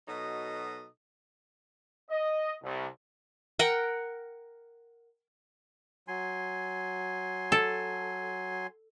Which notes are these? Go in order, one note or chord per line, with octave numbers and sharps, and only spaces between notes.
B2 F#3 D#4 A4 D#5
D#5
C2
A#4 F#5 G5
F#3 G#5 C6
A4